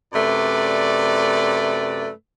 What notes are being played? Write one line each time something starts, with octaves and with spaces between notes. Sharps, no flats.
F#2 C3 A3 B4 D5